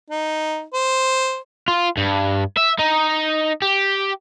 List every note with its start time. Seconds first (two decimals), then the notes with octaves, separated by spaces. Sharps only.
0.10 D#4
0.74 C5
1.68 F4
1.97 G2
2.57 E5
2.79 D#4
3.62 G4